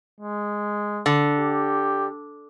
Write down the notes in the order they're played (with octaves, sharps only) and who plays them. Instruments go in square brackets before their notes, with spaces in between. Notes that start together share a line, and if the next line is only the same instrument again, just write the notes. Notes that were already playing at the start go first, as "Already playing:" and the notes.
[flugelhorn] G#3
[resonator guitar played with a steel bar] D3
[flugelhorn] G4